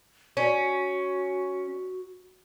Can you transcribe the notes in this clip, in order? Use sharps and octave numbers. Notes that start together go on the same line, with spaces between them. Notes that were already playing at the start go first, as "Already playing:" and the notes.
C#4 F#4